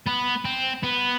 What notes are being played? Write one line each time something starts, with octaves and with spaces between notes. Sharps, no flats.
B3
C4
B3